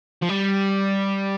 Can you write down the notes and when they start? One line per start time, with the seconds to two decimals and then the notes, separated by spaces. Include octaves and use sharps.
0.22 F3
0.29 G3